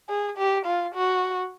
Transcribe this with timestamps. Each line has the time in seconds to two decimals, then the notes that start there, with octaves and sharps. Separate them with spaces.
0.09 G#4
0.38 G4
0.66 F4
0.95 F#4